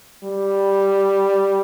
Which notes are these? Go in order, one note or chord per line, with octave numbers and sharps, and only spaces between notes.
G3